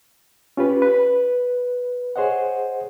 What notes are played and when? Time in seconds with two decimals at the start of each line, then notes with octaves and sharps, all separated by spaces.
0.57 C#4 F4 G4 B4
0.82 B4
2.16 G#4 C5 C#5 D#5 F#5